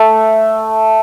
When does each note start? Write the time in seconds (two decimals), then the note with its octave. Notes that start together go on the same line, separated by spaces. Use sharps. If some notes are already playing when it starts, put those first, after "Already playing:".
Already playing: A3